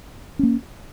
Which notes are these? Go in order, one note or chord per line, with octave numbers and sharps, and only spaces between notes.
A#3 C#4